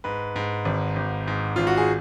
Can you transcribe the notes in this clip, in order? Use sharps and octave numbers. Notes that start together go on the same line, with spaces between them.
G#2 B4
G#2
G#1
G#1
G#2
G#1 F4
F#4
G#4